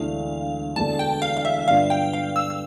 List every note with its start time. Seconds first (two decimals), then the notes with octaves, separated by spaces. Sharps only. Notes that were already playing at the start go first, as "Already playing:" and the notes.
Already playing: E1 D2 D3 A3 E4 F5
0.76 E1 E2 D3 A3 A5
0.99 G5
1.22 F5
1.37 F5
1.45 E5
1.68 G2 D3 G3 B3 F4 F5
1.90 G5
2.13 F5
2.36 E6
2.50 E6